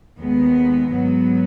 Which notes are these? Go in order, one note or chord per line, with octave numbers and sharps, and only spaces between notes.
D#2 D#3 G#3 B3
G#2 F#3 B3